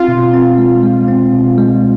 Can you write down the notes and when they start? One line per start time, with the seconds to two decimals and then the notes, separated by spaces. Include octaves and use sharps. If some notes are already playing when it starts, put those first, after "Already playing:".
Already playing: C4 F4
0.08 B2
0.34 C4
0.58 G#3
0.83 G#3
1.08 C4
1.33 B2
1.58 G#3